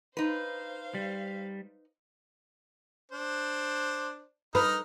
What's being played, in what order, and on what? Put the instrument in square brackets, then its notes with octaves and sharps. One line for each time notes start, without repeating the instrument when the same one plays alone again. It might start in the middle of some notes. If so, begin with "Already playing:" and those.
[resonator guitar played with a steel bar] D#4 B4 [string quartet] C5 F5
[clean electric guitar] G3
[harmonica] D4 C5
[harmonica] D#4 A#5 F6 [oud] B4